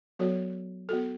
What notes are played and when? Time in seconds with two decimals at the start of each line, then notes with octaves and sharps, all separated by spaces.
0.19 F#3 B3 F#4 A4 C#5
0.89 B3 F#4 A4